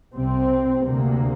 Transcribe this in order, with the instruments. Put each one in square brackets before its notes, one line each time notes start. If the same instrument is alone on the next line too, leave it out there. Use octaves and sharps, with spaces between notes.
[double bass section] C2 C3 C4
D2 C3 A#3